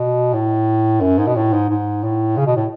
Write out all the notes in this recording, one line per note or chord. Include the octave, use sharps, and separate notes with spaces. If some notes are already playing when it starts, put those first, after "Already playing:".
Already playing: B2
A2
F#2
G#2
B2
A2
G#2
G#2
A2
C#3
B2
A2